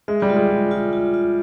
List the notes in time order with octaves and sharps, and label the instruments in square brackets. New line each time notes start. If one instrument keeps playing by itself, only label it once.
[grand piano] G#3 [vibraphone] E5
[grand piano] G3
[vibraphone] F4
[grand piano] G#3
[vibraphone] F4
F4
F4
F4